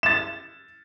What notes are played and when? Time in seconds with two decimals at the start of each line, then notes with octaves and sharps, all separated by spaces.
0.03 A6 E7